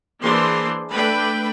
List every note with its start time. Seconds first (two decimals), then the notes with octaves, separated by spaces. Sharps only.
0.22 E3 A#3 D4 G#4 C5 C6
0.92 A3 D4 B4 G5 B5